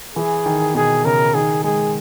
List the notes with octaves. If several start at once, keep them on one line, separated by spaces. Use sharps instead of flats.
E3 G#4
D#3
B2 G#4
C#3 A#4
D#3 G#4
G#3 G#4